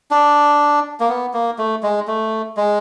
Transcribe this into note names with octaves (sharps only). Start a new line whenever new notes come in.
D4
A#3
B3
A#3
A3
G#3
A3
G#3